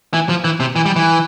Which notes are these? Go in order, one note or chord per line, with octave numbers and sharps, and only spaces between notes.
E3
F3
E3
C3
E3
G3
E3